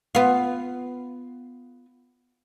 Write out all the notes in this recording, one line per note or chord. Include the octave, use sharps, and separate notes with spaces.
B3 F4